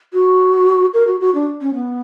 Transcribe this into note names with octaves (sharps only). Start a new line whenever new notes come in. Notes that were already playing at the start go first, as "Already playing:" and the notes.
F#4
A#4
F#4
F#4
D4
C#4
B3